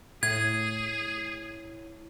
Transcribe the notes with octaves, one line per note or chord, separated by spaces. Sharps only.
A2 E4 G#4 C#5 G#6